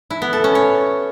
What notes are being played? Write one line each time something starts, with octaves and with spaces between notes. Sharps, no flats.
E4
B3
A4
C#4
C#5